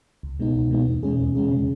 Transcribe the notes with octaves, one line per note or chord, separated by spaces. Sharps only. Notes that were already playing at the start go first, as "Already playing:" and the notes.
C#2
B2 G#3 B3 D#4
C#2
B2 G#3 B3 D#4
E2
B2 G#3 C#4 G#4
E2
B2 G#3 C#4 G#4
C#3